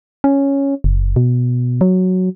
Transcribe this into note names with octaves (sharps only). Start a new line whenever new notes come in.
C#4
F#1
B2
F#3